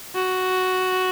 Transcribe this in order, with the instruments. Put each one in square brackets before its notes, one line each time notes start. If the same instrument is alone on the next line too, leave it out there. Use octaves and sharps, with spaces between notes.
[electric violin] F#4